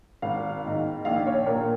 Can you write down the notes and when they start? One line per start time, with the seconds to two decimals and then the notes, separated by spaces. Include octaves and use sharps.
0.22 G#1 F5
0.65 G#2 D#3
1.05 A#1 F5
1.27 C#5
1.47 A#2 A#4